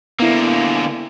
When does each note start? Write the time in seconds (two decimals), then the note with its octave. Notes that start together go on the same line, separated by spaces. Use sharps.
0.20 D3 A#3 B3 E4